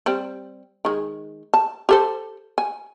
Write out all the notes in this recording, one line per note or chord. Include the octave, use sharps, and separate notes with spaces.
G3 C4
D#3 G#3
A5
G4 A4 C5
G#5